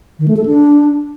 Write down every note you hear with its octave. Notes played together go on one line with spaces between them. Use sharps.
D#3
A3
A4
D4